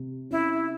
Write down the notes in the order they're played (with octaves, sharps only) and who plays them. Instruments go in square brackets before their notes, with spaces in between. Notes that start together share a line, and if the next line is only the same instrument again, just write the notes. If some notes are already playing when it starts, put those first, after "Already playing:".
Already playing: [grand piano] C3
[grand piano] C#4 [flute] E4